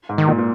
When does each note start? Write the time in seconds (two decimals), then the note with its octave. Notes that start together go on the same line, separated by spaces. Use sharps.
0.09 G#2
0.18 D#3
0.27 A#2
0.38 A#2